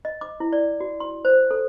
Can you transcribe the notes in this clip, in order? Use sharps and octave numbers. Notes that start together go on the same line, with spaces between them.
D#5
D6
E4
D5
F#4
C6
C5
A4